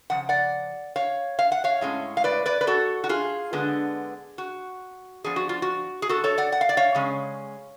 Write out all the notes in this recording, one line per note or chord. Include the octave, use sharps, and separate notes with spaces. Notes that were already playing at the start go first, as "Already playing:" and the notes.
C#3 F3 F#5
D5 F#5
C#5 F5
F5
F#5
C#5 F5
A2 G#3 C#4
F5
B4 D5
B4 D5
B4
F#4 A4
F#4
F4 G#4
D3 G#3 B3 D4
F#4
F3 B3 D4 G#4
F#4
F4
F#4
G#4
F#4 A4
A4 C#5
D5 F#5
F#5
F5
D5
C#5 F5
C#3 G#3 C#4